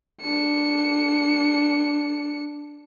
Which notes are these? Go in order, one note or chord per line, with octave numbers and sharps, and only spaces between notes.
D4 C#7